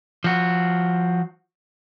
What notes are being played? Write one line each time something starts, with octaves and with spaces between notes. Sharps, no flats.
F3 F#4